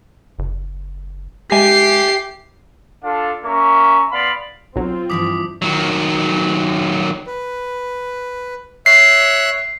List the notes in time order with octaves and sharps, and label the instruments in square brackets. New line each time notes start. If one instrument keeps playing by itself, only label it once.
[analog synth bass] F#1
[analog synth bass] G#3 [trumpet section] G4 [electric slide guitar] E5 G#5 [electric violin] C7
[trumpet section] D4 F4 A4 F5
A#3 C#4 E5 A#5 C#6
B3 D5 F5 B5 C6
[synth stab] B1 F#3 [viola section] C4 F4
[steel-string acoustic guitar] G2 E3 F3 [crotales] D6 D#6 B6
[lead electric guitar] D#3 F#3
[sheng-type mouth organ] B4
[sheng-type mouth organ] C#5 E5 F#6 [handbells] C7